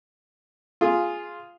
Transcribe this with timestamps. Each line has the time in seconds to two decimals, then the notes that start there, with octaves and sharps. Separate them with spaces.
0.81 F4 G#4